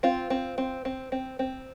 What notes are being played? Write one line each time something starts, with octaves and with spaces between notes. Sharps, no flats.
C4 F4
C4
C4
C4
C4
C4